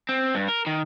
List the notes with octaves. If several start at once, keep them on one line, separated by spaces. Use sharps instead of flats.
C4
G2
A#4
D#3